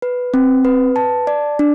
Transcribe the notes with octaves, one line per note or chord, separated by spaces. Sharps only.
B4
C4
B4
A5
D5
D4